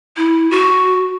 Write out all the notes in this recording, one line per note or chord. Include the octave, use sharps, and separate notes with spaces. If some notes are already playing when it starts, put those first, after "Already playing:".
E4
F#4